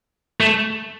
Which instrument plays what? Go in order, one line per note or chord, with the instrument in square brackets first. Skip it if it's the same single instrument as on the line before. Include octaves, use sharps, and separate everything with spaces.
[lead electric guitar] A3